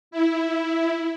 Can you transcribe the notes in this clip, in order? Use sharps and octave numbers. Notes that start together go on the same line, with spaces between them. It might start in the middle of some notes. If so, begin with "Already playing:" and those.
E4